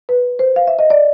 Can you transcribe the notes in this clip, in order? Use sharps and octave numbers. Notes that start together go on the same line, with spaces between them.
B4
C5
F5
E5
D#5
D5